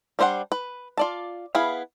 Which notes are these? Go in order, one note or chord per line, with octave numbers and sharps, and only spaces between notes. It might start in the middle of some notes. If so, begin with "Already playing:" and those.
G3 D4 C5 E5 F#5
B4
F4 D5 A5
B3 E4 G#4 F5 B5